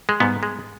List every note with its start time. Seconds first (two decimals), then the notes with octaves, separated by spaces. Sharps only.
0.09 G#3
0.20 G#2 G3 B3
0.43 G#3